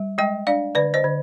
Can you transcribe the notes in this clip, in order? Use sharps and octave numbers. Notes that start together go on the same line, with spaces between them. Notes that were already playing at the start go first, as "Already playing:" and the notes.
Already playing: G3
G#3 D#5 G5
D4 D5 F5
D3 B4 D5
C5 D#5
D3